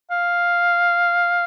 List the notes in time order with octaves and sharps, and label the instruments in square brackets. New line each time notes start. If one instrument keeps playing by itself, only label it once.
[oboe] F5